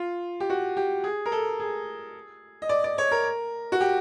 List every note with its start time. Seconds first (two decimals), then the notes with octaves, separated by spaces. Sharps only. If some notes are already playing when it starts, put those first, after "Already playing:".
Already playing: F4
0.40 G4
0.50 F#4
0.77 G4
1.04 G#4
1.26 A#4
1.32 A4
1.60 G#4
2.62 D#5
2.69 D5
2.84 D5
2.98 C#5
3.11 A#4
3.72 F#4
3.81 G4